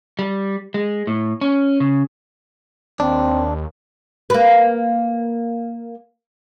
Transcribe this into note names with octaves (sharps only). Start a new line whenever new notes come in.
G3
G#3
A2
C#4
C#3
D#2 C4 D4
A#3 B4